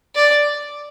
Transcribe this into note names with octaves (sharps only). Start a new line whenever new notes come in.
D5